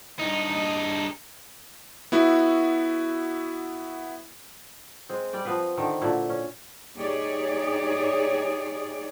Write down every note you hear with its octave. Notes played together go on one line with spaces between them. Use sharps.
G2 D#4
B3 E4 F#4
G#3 C4
G3 D5 G5
F3 B3 C4 B4
D3 D#3 C4
A#2 D3 E4 F#4
C#4
D#4 G4 G#4 C#5 D5